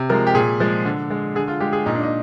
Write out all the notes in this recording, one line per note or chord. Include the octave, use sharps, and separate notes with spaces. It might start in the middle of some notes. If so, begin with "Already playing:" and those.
Already playing: C3
F3 G#3 A#4
G4
A#2 G#4
F3 G#3
D3
G#3
D3 G#4
F4
G#3 G4
G#4
A#2 D#4
D4
D#4